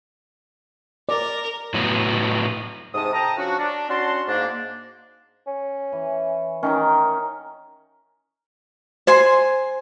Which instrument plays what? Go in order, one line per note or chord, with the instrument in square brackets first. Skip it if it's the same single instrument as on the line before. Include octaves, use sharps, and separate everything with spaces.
[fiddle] A#4 [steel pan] D5
[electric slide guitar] A2 F#3 B3
[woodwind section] G#2 C3 A5 D#6
A4 G5 A5 A#5
F3 C#4 D4 F#4
D4
C#4 D4 F#4 F#5 A5 C6
G#2 A#3 D4
[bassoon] C#4
[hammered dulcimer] E3
[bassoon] D#3 [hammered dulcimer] C#4 D#4 A#4
[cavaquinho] C5 G#5 C6